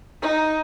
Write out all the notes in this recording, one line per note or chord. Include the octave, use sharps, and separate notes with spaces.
D#4